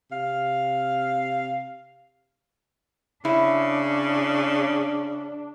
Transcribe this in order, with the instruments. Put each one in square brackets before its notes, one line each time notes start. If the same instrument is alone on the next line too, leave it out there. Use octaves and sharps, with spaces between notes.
[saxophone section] C3 F5
[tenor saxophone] C#3 [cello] D4 [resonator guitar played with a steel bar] E4